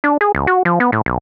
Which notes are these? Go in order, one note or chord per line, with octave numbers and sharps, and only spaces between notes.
D4
G#4
C#2
F#4
F3
B3
A2
B1